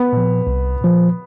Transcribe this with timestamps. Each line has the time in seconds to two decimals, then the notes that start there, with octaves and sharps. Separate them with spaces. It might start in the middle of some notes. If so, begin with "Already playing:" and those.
Already playing: B3
0.12 A#2 F3
0.47 C2
0.81 A#2 F3